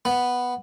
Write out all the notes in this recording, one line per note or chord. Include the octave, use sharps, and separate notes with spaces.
B3